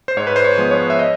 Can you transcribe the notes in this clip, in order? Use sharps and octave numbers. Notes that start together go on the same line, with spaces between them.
C5
G#2 C#5
B4
C5
C#5
F3 G#3 B3
C#5
E5
D#5